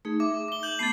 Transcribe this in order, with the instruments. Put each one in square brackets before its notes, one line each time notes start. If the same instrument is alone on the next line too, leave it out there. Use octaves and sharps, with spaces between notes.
[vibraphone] A3 D#4 G#4
[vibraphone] E5 [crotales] D6
[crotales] D6 G7
G6 F#7
[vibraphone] A3 B3 A5 [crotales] A6 C7